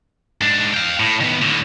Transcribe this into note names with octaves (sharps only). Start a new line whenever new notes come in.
G#2 D4
F5 G5
A2
D#3 B3
A2 D3